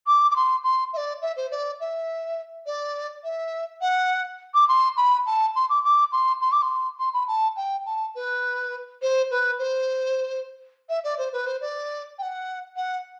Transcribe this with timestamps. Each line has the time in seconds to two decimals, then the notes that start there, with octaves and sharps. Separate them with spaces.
0.06 D6
0.30 D6
0.35 C6
0.64 C6
0.93 E5
0.97 D5
1.21 E5
1.36 C5
1.51 D5
1.80 E5
2.66 D5
3.23 E5
3.81 F#5
4.54 D6
4.68 C6
4.97 B5
5.26 A5
5.55 C6
5.69 D6
5.84 D6
6.12 C6
6.41 C6
6.51 D6
6.62 C6
6.99 C6
7.13 B5
7.27 A5
7.56 G5
7.86 A5
8.15 B4
9.02 C5
9.30 B4
9.58 C5
10.89 E5
11.04 D5
11.18 C5
11.32 B4
11.46 C5
11.61 D5
12.18 G5
12.22 F#5
12.76 F#5